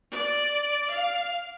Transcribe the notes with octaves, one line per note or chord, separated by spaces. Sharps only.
D5
F5